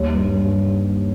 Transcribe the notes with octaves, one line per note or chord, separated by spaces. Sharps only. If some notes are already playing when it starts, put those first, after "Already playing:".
Already playing: D#2 G3 C#5
G2
G2